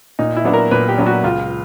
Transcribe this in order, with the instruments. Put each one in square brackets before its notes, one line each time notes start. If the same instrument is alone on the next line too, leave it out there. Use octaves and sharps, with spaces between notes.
[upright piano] A#2 [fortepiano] D#4
[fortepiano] E4
[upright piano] F#3 B3 D4
[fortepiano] A#4
[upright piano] A#2 [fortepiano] B4
[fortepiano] G4
[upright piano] F#3 B3 D4
[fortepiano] F#4
[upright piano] C#2 [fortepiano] F4